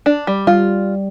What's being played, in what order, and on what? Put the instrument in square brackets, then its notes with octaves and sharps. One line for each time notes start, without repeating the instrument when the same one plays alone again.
[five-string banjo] D4
G3
[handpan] G3 [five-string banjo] F4